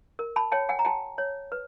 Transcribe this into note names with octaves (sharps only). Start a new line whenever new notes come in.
A#4
A5 B5
C#5 G5 A5
F#5 G#5
A#5
F#4 G5 A5
C#5
B4